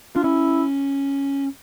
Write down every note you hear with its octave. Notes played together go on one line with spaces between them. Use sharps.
D4 F4
C#4 E4